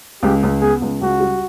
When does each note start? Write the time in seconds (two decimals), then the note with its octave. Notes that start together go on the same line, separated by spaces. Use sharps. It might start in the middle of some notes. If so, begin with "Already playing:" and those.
0.23 C#2 G4
0.43 C#2
0.61 B3 G#4
0.82 C#2
1.01 C#2 F#4
1.20 G3